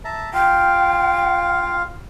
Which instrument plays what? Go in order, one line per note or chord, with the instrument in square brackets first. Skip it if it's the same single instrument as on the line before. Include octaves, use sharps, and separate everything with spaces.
[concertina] E5 A5 A#5
[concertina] F4 F5 [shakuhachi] G5